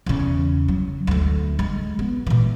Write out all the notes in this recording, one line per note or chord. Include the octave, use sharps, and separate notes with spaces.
E2 C#3
F#3
D2 A3
G#3
B3
A#2 E3